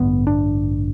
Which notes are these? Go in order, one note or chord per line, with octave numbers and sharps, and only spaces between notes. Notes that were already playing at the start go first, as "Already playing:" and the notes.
Already playing: A1 G2 D3 B3
D4